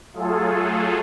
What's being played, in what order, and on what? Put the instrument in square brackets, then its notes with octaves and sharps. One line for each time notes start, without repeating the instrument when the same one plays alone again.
[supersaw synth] F#3 A3 F4 G#4 A4